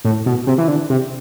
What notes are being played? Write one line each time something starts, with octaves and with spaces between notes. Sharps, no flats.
A2
B2
C3
E3
D3
C3